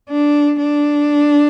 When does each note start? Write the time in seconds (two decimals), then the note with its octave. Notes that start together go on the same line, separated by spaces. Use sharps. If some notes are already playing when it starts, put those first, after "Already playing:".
0.10 D4
0.59 D4